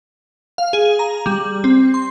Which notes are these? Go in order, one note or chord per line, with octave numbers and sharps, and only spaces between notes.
F5
G#4
A#5
G3
C4
C6